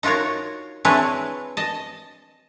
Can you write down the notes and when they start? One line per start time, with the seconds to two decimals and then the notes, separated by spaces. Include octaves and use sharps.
0.03 D#4 F4 F#4 A#4 C#5
0.85 C4 D4 E4 G#4 B4 C#5
1.57 D#5 A5